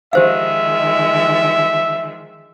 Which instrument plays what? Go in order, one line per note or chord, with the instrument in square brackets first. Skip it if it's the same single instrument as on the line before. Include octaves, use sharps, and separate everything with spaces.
[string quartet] D#3 F3 G#3 [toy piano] G4 C5 F5 [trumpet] E5